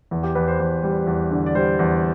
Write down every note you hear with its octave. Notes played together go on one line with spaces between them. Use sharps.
E2
G4
E2 B4
C5
E2 C5
G3
E2
D3
D5
G3 C5
E2